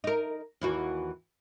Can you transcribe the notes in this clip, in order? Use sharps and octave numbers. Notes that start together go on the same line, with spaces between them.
D#4 A#4
D#2 E3 F#4